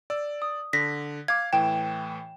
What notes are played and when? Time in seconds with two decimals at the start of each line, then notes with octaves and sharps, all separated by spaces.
0.10 D5 E6
0.42 D#6
0.73 D3 A#6 B6
1.28 F5 D6 G#6
1.53 A2 E3 G5 E7